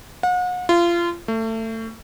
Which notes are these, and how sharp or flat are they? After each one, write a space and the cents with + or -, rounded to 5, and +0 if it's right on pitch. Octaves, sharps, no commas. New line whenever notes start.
F#5 -40
F4 -25
A3 +25